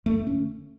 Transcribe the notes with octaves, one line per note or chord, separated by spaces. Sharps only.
F#2 A3
D3 C#4